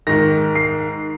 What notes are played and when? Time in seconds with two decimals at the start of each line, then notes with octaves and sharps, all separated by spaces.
0.07 G#2 D#3 A#6
0.55 C7